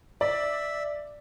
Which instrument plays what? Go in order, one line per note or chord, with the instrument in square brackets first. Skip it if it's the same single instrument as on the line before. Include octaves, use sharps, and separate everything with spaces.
[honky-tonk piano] D5 [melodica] E5